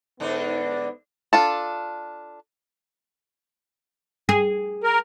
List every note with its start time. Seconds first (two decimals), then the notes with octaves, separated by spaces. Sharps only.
0.20 G#2 D3 B3 D4
1.33 D4 F4 A4
4.29 G#4
4.84 A#4